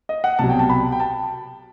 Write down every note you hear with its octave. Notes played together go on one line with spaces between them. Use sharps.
D#5
F#5
C2 B2 F#3 A5
G5
A5
B5
G5
A5